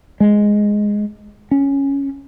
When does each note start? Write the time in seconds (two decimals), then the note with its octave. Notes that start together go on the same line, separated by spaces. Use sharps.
0.20 G#3
1.51 C#4